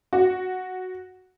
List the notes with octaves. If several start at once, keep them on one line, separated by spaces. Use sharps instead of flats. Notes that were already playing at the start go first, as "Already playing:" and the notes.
F#4